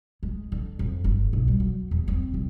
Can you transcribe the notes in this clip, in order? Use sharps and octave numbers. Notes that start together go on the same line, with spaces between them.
G#3
D3
F2
G1
B1
G3
F#3
E2
C4
C2